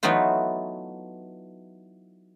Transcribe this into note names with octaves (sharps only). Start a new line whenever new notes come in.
E3 F#3 A3 B3 D#4 F4